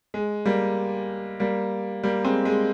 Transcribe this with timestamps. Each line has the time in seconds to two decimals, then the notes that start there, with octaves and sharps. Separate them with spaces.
0.14 G#3
0.46 G3 A#3
1.40 G3 A#3
2.03 G3 A#3
2.25 G#3 C4
2.45 G#3